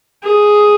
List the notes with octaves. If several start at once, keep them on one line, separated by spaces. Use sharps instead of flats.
G#4